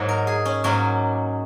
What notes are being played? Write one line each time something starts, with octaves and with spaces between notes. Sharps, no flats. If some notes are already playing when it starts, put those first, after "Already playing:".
Already playing: G#2 F#3 A#3 C#5
A#4
G#4
C#4
G#2 F#3 A#3 C#4